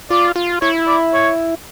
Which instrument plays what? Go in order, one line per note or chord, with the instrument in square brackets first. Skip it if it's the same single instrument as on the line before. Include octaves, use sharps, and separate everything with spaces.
[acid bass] F4 [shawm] D5
[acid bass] F4
[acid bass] E4 [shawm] C#5
[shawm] D5
C#5